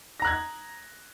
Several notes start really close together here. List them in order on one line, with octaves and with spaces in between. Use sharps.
A#6 A#5 F#6 G#6